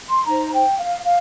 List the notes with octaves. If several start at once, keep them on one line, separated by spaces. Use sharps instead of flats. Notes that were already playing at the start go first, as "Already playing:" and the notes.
C6
D#4 C5 A#5
G5
F5
F5